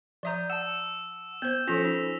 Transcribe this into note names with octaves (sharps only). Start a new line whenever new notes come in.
F3 D5 E5 A#5 D#6 G6
F#5 A5 E6 E7
B3 C5 G6
F3 C#4 F4 A4 C5 A#6 B6 F7
D#4